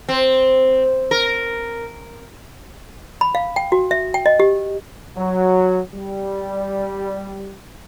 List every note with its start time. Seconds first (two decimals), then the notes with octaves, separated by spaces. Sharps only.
0.09 C4
1.11 A#4
3.21 B5
3.35 F5
3.56 G5
3.72 F#4
3.91 E5
4.14 G5
4.26 D#5
4.40 G4
5.17 F#3
5.93 G3